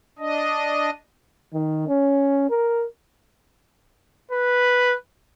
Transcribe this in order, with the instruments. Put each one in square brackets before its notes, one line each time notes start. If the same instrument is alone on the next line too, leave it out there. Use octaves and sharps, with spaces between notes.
[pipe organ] D4 D#5
[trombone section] D#3
C#4
A#4
[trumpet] B4